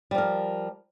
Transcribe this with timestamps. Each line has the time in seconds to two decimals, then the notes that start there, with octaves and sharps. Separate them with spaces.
0.11 G3
0.15 F3
0.18 A#4